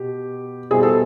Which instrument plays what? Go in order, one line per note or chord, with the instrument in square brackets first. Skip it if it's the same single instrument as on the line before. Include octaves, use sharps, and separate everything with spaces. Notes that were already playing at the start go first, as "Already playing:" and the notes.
Already playing: [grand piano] B2 [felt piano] G4
[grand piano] B2 G3 C4 E4 [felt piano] G#4
[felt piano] A4